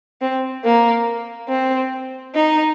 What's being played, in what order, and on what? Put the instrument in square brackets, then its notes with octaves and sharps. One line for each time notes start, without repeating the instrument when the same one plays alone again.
[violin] C4
A#3
C4
D#4